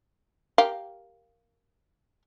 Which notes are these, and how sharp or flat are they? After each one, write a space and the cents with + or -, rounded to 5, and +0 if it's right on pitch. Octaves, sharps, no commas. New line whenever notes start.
G4 +0 A#4 +0 F5 +0